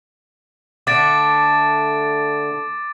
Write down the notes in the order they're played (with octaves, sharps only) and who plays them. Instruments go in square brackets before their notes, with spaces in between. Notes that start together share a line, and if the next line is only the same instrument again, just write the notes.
[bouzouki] D3 A3 D4 [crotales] D6 A6 D7